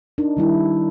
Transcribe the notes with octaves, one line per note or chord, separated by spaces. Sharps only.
D4 D#4 A#4
D#3 G3 E4